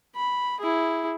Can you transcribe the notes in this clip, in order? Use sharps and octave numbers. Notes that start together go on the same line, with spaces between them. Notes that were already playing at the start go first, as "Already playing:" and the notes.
B5
E4 G#4